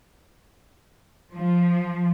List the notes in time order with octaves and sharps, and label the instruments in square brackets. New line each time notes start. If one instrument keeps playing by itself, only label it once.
[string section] F3